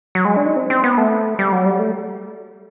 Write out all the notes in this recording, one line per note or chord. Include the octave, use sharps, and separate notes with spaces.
F#3
G#3
D4
D#4
C4
C4
B3
A3
G3
F#3
G3
A3